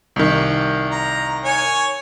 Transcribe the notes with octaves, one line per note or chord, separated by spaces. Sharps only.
C2 D#3
A#5
C#5 G#5